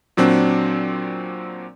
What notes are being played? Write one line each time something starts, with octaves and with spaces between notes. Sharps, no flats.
A#2 F#3 C4 D4